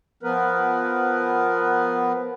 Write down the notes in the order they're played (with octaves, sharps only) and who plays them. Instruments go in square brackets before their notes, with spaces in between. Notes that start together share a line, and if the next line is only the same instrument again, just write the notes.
[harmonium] F3 B3 A#4 B4